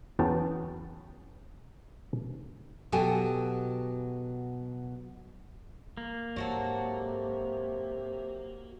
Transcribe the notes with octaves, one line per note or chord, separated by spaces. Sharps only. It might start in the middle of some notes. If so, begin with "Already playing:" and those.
E2 F#3 B3 C#4 G5 A5
B2 F#3 F#4 G4 A4 G#5
A#3
G#2 C3 F#3 F#4 A4